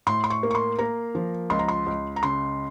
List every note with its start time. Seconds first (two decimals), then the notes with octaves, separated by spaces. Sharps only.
0.07 A2 C6
0.24 C6
0.30 C#6
0.43 A#3
0.51 C#6
0.55 C6
0.79 A#3 A#5
1.15 F3
1.50 C#2 C6
1.59 A#5
1.68 C6
1.86 C#2
2.16 A#5
2.23 C#3 C6